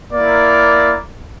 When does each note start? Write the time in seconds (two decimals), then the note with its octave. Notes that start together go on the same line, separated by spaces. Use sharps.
0.12 A#3 E4 A#4 D5